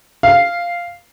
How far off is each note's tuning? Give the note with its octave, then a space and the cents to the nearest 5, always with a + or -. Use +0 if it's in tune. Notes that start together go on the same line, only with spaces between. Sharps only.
F5 -5